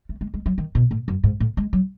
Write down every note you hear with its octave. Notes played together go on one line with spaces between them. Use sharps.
A3
G#3
G#3
F#3
D#3
B2
A2
F#2
G#2
A2
G#3
F#3